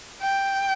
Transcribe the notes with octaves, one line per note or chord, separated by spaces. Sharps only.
G5